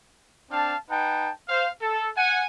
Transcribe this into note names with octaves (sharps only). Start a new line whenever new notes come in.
C4 D4 F5 A5
D#4 B4 F#5 G5 A5
C5 F5
A4
F#5 G#5